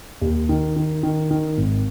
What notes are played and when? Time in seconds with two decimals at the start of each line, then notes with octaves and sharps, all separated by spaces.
0.21 D#2
0.49 D#3
0.76 D#3
1.03 D#3
1.31 D#3
1.58 G#1